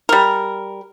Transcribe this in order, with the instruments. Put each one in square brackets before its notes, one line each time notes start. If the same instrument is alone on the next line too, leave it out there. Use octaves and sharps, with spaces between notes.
[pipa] G3 A#4